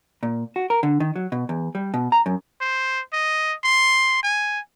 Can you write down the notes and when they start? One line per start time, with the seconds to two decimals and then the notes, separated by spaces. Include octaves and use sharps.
0.23 A#2
0.56 F#4
0.70 A#4
0.83 D3
1.00 D#3
1.16 F#3
1.32 B2
1.49 E2
1.75 G3
1.94 B2
2.12 A#5
2.26 F#2
2.61 C5
3.13 D#5
3.63 C6
4.23 G#5